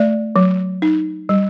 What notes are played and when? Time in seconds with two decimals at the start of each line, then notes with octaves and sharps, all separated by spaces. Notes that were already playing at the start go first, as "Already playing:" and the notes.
Already playing: A3 D5
0.36 F#3
0.82 D#4
1.29 G3